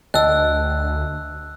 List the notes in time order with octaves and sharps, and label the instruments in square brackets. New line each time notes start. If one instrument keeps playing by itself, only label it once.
[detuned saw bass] D2 [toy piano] D#5 [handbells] G5 A5 [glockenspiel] E6 F#6